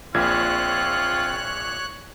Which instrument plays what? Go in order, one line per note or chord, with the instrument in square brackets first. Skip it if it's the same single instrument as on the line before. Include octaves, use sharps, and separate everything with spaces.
[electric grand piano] A#1 A#2 G#6 [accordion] C4 [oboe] F4 [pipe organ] C#5 F#6